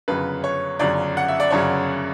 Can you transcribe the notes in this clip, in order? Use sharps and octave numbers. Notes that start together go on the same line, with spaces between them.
G1 F#2 C#3 B4
C#5
G1 F#2 C#3 D5
F#5
E5
D5
G1 F#2 C#3 C#5